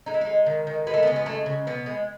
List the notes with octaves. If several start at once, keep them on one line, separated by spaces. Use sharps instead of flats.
G#3 D#4
E4
D#4
G#3
D#3
D#3
G#3 B3
A3
B3
C#3
B3
G#3 A3
C#3
B2 B3
G#3